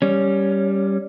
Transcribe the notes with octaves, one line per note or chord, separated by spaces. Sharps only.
G3 C#4